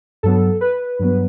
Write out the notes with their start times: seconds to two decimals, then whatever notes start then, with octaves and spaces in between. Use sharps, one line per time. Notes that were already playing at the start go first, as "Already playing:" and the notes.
0.23 G2 F#3 B3 A4
0.61 B4
0.99 G2 F#3 B3